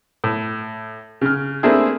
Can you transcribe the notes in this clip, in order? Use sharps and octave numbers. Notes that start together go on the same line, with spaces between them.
A2
C#3 F6
A3 A#3 C4 D4 E4 G#4